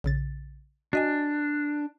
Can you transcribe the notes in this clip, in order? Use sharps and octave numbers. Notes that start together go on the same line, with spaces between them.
A#1 C#3 A6
D4 F#4 D#5 G#5